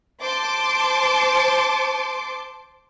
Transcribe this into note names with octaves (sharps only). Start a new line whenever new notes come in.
C5 A5 C6 D6